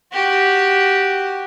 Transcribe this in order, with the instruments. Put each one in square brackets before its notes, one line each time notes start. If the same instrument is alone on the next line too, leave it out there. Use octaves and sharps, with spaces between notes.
[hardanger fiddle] F#4 G4